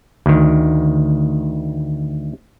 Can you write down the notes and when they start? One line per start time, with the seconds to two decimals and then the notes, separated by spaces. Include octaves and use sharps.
0.26 D2 D#3